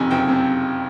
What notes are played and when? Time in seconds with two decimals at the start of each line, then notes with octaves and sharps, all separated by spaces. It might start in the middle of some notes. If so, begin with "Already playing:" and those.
Already playing: F#1 F2 C3 D#3 G#5
0.11 F#1 G5
0.28 C3